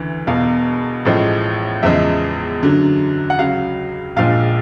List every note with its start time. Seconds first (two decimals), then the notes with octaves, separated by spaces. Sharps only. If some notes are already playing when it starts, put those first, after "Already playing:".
Already playing: D2 C#3 E3
0.27 E1 E2 B2 F5
1.05 A1 A2 F3 G#3
1.83 E2 C#3 F3 G#3 E5
2.61 F#2 D3 F#3
3.30 F#5
3.39 C#2 C#3 F#3 F5
4.16 A#1 A#2 F3 G#3 F5